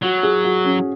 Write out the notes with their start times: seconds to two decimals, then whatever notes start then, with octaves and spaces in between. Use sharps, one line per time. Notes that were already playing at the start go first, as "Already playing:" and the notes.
0.02 F#3 F#4
0.23 G#4
0.44 F#4
0.65 C#4